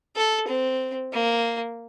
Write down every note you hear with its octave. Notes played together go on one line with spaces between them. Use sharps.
A4
C4
A#3